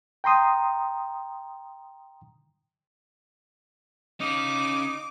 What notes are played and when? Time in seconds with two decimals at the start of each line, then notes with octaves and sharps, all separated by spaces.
0.24 G5 A#5 C6 D#6
4.20 C#4 D#4 F5 D6